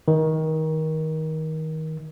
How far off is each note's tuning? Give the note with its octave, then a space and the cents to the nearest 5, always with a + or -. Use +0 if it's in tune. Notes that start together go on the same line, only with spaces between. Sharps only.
D#3 +20